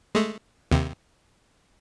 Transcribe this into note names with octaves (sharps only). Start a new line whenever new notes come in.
G#3 A3
D#2 C3